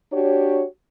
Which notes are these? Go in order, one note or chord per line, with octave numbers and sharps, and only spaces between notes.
D4 F#4 G4 C#5